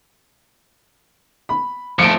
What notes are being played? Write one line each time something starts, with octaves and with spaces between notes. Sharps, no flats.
B5
F3 A3 C#7 D7